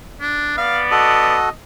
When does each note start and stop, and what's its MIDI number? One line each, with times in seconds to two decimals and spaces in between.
0.20 0.57 62
0.57 1.37 59
0.57 1.37 74
0.57 0.80 77
0.91 1.49 66
0.91 1.49 69
0.91 1.49 75